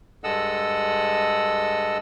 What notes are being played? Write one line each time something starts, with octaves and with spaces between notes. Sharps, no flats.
G2 G#3 A4 D#5 F#5 E6